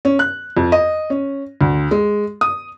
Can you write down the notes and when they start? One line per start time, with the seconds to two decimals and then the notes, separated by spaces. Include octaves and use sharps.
0.05 C#4
0.19 F#6
0.57 F2
0.72 D#5
1.10 C#4
1.61 D2
1.91 G#3
2.41 D#6